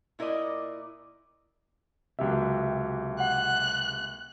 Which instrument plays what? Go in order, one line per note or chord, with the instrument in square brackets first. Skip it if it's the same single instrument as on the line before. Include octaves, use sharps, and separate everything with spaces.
[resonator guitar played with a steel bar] A#2 E4 A#4 D5 D#5
[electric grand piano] C#2 G4 E5 [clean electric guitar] C3 F#3 A#3
[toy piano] F#5 [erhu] F#6